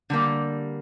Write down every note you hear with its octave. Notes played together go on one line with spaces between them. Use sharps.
D3 G3 A#3